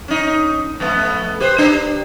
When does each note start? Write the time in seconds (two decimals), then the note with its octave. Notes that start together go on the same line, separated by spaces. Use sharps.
0.08 C#4 D#4
0.80 F2 A3 B3
1.40 G4 B4 C5
1.58 D4 G4